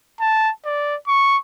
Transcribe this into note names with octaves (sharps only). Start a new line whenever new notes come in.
A5
D5
C#6